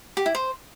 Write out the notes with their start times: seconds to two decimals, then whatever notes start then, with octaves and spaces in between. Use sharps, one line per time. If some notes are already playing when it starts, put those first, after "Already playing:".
0.17 G4
0.26 E4
0.35 C5